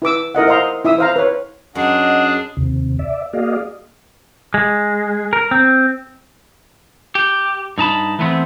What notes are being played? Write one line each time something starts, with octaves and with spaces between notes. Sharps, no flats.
E4 B4 D6 E6
E4 A#4 D#5 F#5
C5 D#5 F5 A#5 C6
E4 E5 D#6 E6
C5 F5 A#5
B4 C#5
F#2 D4 G#4 D#5 F#5
D#2 C3
D5 E5
A#3 F#4 G#4 D5 D#5 F5
G#3
A#4
C4
G4
G2 D#4 A5 B5
E3 A3 B3 C4